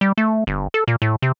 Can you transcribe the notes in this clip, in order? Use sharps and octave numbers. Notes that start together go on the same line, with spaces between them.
G3
A3
G1
A4
A#2
A2
C3